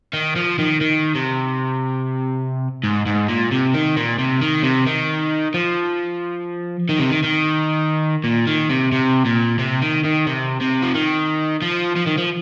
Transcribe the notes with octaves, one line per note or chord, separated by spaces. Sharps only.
D#3
F3
D#3
D#3
C3
G#2
G#2
A#2
C3
D#3
A#2
C3
D#3
C3
D#3
F3
D#3
C3
D#3
D#3
A#2
D#3
C3
C3
A#2
C3
D#3
D#3
C3
C3
F3
D#3
F3
F3
D#3
F3